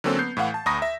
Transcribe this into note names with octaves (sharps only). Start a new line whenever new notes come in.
D3 F#3 A#3 C4 C#4 A4
B3 G6 C7
A2 E3 F5 F#5
A5
D2 A#5 B5 C#6 D#6 A#6
E5